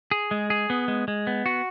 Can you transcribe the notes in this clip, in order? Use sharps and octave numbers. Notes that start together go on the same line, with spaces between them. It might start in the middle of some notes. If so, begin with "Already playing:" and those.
G#4
G#3
G#4
B3
G#3
G#3
B3
F#4